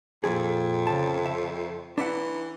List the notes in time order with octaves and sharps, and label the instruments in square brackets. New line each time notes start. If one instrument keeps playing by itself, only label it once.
[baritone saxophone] F2 [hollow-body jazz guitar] A#2 F3 G#4
[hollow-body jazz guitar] C#3 A5
E5
[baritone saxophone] E3 [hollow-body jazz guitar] D4 E5 F#5